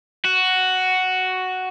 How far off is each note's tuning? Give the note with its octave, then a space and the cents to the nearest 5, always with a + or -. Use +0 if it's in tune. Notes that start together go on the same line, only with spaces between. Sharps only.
F#4 +5